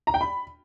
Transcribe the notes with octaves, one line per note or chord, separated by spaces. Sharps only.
A#5
G5
B5